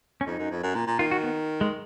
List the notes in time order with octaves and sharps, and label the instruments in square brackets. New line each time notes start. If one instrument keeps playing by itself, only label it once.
[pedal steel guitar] C#4
[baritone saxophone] F2 [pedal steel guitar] D#4
[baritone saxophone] F#2
F2
F#2
A#2
A#2
[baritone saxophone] D#3 [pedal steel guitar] F4
[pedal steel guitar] F#4
B3
G#3